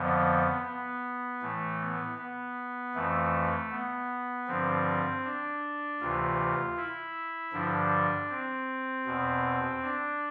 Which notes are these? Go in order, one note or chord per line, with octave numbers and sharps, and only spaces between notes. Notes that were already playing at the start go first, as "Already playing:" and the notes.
Already playing: F2 D3 F3 B3
B3
A2 E3 A3
B3
B3
F2 E3 A3
B3
G2 D3 F3 C4
D4
D2 C3 E3 F4
E4
G2 D3 F3 D4
C4
E2 B2
D4